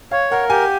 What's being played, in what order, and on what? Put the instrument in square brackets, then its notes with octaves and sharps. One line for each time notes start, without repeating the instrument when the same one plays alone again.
[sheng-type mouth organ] C#5 [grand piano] F5
[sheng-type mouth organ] A#4 [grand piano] F#5
[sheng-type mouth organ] G4 [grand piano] G#5